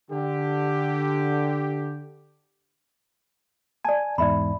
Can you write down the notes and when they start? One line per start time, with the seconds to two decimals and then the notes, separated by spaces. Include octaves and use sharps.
0.11 D3 G4
3.85 D5 G#5 A5
4.18 E2 G#2 D5 E5 B5